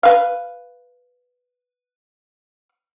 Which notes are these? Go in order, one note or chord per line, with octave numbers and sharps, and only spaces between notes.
B4 F5